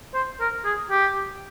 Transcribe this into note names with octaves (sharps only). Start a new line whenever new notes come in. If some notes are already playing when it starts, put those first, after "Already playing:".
C5
A#4
G#4
G4